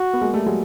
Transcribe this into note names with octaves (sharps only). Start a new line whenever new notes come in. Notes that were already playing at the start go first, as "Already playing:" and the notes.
Already playing: F#4
B3
G#3 A#3
G3 A3
F#3 G#3